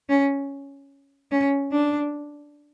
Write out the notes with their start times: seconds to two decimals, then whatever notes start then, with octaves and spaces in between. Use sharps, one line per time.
0.09 C#4
1.32 C#4
1.72 D4